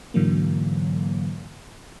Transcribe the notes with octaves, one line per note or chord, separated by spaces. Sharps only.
G#2 D3 E3 F#3 A#3